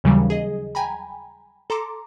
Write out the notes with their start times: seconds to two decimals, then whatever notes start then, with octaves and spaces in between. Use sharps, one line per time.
0.04 D#2 C#3 E3 F#3 G3
0.30 G#4 D#5
0.75 G5 G#5 A#5 B5
1.70 A4 A#5 C6 D6